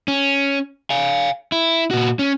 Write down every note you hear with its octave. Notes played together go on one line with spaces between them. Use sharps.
C#4
F5 G#5
E4
A#2 F#4
C#4